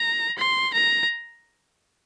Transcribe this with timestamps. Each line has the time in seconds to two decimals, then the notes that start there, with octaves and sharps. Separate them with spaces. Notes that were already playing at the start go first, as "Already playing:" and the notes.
Already playing: A#5
0.38 C6
0.73 A#5